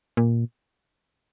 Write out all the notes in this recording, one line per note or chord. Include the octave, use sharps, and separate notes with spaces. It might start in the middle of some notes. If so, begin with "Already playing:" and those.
A#2